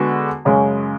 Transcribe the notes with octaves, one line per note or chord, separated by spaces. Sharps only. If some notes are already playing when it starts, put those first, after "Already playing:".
Already playing: D3 G#3 B3 F#4
F#2 C#3 G#3